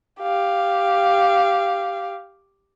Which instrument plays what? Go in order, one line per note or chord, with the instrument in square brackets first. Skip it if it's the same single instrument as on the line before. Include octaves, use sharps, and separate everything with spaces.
[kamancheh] G4 F5